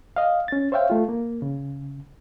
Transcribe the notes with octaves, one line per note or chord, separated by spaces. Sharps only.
D#5 F5
C#4 A6
C5 C#5 E5 F5 G5
A3 F4
A#3
C#3